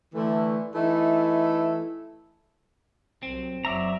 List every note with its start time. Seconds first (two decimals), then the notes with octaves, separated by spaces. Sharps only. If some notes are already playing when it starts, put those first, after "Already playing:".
0.14 D3 E3 A3
0.74 E3 A3 D#4 E4
3.23 C2 F#3 C4
3.65 F#1 F#2 F#3 D5 E5 A#5